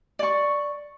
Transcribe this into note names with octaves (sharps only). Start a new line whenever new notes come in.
D5 C#6